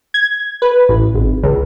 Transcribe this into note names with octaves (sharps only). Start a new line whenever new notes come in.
G#6
B4
A1
G#1
C#2